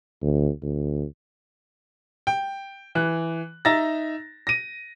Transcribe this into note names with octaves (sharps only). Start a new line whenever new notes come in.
D2
D2
G5
E3 F#6
D#4 E5 A#5 A6 A#6
A#6 D#7